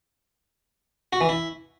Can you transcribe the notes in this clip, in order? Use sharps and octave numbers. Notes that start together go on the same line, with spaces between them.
F#4
E3
E4